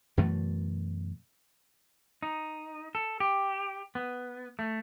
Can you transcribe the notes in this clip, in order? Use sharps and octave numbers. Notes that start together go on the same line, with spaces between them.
F#2 B2 E3 A3
D#4
A4
G4
B3
A3